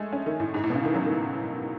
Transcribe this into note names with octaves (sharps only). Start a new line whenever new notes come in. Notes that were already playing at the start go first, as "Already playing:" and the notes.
Already playing: G#3 A3
C#4
D#3
A2
G#2
A2
B2
C#3
D#3
F#3
D#3